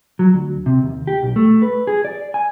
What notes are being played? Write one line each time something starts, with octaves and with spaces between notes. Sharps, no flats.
F#3
D2
C3
D#2
G4
B1
A3
B4
G#4
D5
G#5